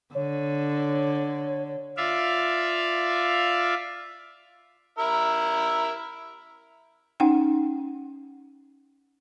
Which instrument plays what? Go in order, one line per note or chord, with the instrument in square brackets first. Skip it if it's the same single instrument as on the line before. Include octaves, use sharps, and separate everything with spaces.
[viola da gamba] D3 [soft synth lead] C#5
[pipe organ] F4 D5 E5 F5
[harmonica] E4 A#4 E5
[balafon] C#4 D#4 F#5 G5